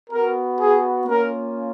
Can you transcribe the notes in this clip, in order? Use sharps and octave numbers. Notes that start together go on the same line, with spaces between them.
B3 F#4 A#4
G#4
A#3 C#4 F4 A#4